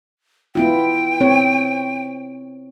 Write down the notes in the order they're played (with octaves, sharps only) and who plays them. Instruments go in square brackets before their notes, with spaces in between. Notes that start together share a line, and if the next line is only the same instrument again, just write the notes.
[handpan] B3 E4 F4 [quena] G5
[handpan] C4 C#5